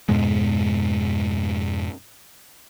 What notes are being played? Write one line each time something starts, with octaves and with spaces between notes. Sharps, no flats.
F2 G#2 B2 G#3